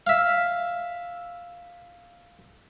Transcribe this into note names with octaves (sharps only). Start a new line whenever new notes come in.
E5 F5